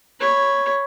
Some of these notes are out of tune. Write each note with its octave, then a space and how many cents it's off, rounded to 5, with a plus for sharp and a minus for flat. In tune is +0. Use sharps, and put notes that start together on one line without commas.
C#5 +0 B5 +0